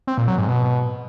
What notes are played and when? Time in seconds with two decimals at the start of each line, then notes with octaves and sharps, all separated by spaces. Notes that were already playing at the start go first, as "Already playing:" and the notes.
0.07 C4
0.18 A#2
0.28 F#3
0.38 G#2
0.48 B2